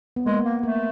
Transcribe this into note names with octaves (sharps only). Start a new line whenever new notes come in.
B3
G#3 A#3
A#3
A3 A#3